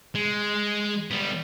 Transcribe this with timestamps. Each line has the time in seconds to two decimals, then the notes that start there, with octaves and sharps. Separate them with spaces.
0.15 G#3
1.11 G3 B3